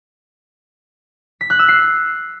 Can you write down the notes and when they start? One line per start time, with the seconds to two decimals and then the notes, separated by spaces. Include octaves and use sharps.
1.41 B6
1.50 F#6
1.59 E6
1.68 C7